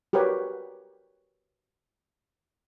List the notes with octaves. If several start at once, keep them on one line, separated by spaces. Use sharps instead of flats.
F#4 G4 A#4 B4 C#5